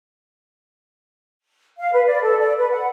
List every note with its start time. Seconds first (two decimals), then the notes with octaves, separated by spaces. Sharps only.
1.79 F5
1.93 B4
2.06 D5
2.22 A4
2.39 D5
2.57 B4
2.71 F#5